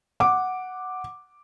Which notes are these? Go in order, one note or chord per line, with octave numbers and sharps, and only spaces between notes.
F#5 D6